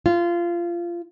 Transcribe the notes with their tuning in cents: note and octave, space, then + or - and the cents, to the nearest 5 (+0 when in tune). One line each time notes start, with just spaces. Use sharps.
F4 -20